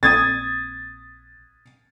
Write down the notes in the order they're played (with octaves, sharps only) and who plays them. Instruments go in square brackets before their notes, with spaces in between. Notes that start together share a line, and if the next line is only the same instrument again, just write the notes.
[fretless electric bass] A#1 C4 [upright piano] D#6 G#6 A6